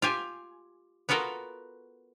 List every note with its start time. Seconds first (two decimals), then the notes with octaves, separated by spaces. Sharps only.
0.02 F4 G4 G#5
1.09 B3 F4 F#4 A4 A#4